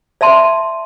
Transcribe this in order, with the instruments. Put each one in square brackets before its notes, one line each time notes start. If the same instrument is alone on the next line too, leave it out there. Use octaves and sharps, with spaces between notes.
[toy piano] D5 E5 A5 C6